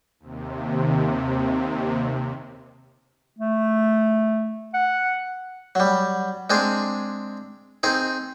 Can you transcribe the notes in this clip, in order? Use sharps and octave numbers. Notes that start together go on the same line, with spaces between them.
D#2 C3
A3
F#5
F#3 G3
G#3 C4 D4 G#4
C4 D#4 G#4